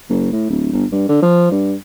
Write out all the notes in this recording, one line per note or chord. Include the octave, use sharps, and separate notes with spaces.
F#1
A2
D1
G1
G2
D3
F3
G2